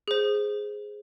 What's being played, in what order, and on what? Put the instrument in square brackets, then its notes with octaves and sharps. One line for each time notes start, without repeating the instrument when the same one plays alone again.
[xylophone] G#4 C5